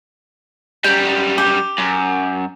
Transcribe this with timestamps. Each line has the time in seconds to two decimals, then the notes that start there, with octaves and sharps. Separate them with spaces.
0.84 F#2 G3 G5
1.38 G4
1.79 F#2